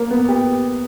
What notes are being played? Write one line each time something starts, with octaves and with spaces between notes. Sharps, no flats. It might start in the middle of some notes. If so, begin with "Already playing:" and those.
Already playing: A#3
B3
G4